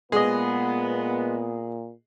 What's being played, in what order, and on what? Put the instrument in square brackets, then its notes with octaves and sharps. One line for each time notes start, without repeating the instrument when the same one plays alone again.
[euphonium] A#2 [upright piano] G#3 [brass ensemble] B3 [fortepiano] G#4 D#5